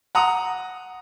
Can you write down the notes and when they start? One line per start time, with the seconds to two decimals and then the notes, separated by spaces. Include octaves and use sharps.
0.15 F#5 A#5 D#6